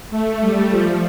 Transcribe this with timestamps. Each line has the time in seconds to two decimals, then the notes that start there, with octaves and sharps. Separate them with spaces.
0.10 A3
0.41 G3
0.70 F3